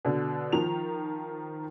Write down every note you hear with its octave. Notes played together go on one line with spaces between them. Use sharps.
B2 D3
D#3 F3 F7